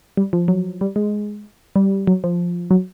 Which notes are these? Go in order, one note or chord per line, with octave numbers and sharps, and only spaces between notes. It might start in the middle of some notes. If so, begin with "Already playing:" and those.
G3
F3
F#3
G3
G#3
G3
F#3
F3
F#3